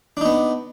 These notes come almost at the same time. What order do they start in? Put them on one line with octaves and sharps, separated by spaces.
D4 D#4 B3